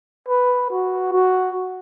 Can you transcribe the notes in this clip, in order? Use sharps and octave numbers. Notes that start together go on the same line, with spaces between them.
B4
F#4
F#4